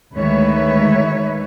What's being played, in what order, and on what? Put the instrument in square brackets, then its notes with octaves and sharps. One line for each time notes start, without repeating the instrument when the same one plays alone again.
[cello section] D2 D#3 G#3 B4 C#5 E5